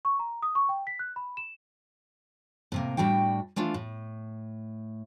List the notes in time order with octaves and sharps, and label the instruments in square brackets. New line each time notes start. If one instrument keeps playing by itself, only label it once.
[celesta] C#6
A#5
D#6
C#6
G5
B6
F#6
B5
E7
[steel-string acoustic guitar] A2 C3 A#3
A2 G3 D4 F#4 G5
E3 A3 D4 F4
A2